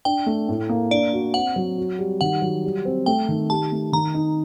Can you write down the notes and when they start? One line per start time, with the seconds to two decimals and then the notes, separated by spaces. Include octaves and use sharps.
0.05 D4 G5
0.26 A3
0.49 A2
0.69 A#3
0.91 D4 D5
1.13 F#4
1.34 C4 F#5
1.56 F#3
1.78 F#4
1.99 G3
2.21 D#3 F#5
2.42 F#3
2.64 G3
2.85 C4
3.06 A3 G5
3.29 D#3
3.50 G4 A5
3.72 A3
3.92 D#3 A#5
4.14 D#4